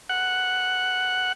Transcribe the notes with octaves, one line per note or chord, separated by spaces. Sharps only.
F#5